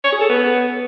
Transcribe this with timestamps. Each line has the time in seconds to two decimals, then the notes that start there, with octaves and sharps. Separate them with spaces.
0.04 C#5
0.13 G#4
0.21 A4
0.30 B3